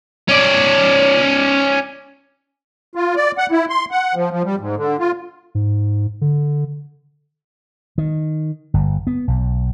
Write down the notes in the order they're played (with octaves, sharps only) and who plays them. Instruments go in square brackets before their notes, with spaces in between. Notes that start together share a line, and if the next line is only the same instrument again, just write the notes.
[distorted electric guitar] C#4 D5
[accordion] F4
D5
F#5
E4
C6
F#5
F3
F3
G3
G#2
D3
F4
[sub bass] G#2
D3
[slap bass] D#3
G1
B3
B1